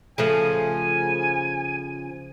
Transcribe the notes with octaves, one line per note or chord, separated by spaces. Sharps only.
C#3 F3 A3 G#5